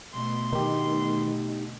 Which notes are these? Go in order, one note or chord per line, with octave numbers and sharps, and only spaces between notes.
B2 D3 A3 C6
D#3 D#4 G4